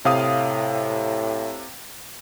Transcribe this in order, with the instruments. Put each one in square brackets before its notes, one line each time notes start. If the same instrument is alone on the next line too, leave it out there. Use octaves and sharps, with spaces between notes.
[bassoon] A2 [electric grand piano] C3 F5 D#6